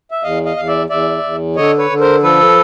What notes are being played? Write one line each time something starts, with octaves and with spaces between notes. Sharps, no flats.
E5
E2 D#5 F5
D#5 F5
E2 F5
D5 E5
E2 D5 E5
E2
D3 C#5 D#5
B4 C#5
D3
A#4 C5
F3 A4 B4